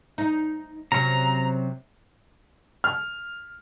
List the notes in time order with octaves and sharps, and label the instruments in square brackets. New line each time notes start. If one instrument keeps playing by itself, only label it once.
[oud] D#4
[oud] C3 F#3 C#4 [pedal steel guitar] A#5
[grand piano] F6